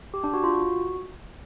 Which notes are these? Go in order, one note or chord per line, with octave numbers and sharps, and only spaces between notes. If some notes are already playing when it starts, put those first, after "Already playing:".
G4
D4
F#4
F4
F#4